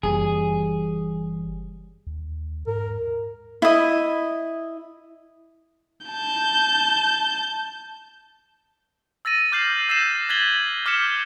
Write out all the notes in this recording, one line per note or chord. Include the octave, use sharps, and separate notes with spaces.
F#1 E3 G3 G#4
D#2
G#2 A#4
E4 D#5
A5 G6
E6 A6 A#6 D#7
D6 F6 G6 A6 C7 F#7
E6 A6 A#6 C7 E7
F#6 G#6 A6 B6 F#7 G7
D6 F6 G6 B6 C#7 E7